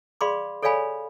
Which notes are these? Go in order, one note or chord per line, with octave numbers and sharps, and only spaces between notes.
G#4 D5 F5 B5 C6 D6
A4 C#5 D5 F5 G#5 B5